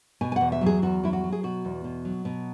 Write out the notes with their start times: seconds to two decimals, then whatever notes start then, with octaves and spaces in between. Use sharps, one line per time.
0.21 B2 G#5
0.32 G#5
0.36 E2 F#5
0.52 E5
0.61 F#3
0.66 G#4
0.82 E2 F#4
1.03 F#3 E4
1.13 F#4
1.24 F#3
1.32 G#4
1.43 B2 F#4
1.65 E2
1.84 B2
2.05 F#3
2.25 B2